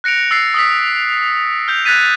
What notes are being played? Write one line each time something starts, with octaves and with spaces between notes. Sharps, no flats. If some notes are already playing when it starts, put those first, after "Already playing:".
F#6 A#6 C#7 D7 F7
E6 A6 C7
D#6 E6 B6
F6 G6 F7
F#6 G#6 A6 B6 D#7 F7